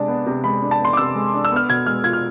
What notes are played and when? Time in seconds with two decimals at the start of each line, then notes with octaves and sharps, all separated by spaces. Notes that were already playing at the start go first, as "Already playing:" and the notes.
Already playing: C3 G#3 D4 A5
0.08 B3
0.26 C3
0.44 G#3 B5
0.62 D4
0.71 A5
0.80 B3 C6
0.93 D6
0.97 C3 E6
1.15 G#3
1.34 D4
1.45 E6
1.51 B3 F6
1.69 B2 G#6
1.86 G#3 F6
2.04 F4 G#6
2.13 F6